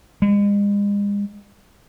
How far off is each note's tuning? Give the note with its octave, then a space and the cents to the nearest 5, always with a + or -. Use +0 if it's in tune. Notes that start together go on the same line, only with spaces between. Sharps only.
G#3 -40